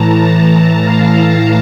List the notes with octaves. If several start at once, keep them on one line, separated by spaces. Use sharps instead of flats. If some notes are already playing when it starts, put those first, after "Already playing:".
Already playing: A2 E3 A5 A#5
A5
F5